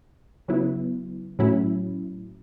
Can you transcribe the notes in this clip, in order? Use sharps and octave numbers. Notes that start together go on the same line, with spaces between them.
C#3 F#3 B3 E4
A2 F#3 C#4 E4